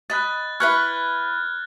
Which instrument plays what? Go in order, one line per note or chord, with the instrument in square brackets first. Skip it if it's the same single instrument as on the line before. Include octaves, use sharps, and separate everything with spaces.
[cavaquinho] D#5 B5 [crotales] F#6 A6
[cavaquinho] E4 B4 C#6 [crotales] F6 F#6 G#6